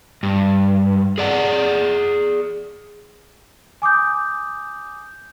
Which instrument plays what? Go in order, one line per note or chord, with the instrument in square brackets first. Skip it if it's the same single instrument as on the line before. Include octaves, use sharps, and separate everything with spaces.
[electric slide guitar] G2
G#4 D5 F#5
[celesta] G#5 D6 D#6 G6